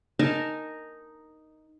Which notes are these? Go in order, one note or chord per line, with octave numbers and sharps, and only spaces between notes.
D#4 A#4 G#5 A5